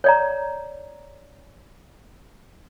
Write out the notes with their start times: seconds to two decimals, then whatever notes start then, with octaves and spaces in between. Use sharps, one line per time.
0.04 C#5 D5 A#5